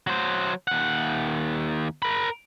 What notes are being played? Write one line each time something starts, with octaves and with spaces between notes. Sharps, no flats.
F#3 C5
D#2 F#5
A#4 B5